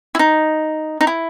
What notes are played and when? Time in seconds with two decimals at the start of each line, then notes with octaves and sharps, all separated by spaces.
0.15 E4
0.19 D#4
1.01 D#4
1.07 E4